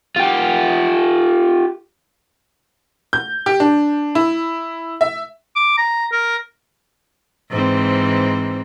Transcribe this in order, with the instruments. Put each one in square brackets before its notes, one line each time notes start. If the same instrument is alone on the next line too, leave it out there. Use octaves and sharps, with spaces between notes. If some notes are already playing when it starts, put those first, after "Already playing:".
[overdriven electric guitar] F4 G4
[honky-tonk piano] G6
G4
D4
E4
E5
[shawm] D6
A#5
A#4
[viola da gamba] G#2 E3 C4